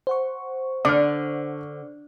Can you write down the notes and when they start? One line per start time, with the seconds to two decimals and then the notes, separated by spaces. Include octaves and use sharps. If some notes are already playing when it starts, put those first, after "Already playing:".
0.07 C5 F#5 C#6
0.85 D3 D4 D5 F6